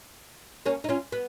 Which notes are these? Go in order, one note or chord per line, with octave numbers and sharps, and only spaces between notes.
A#3 C#4
D#4
C#4 F4
B3